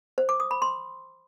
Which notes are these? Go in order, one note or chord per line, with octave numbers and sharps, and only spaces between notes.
C5
D6
D#6
B5
C6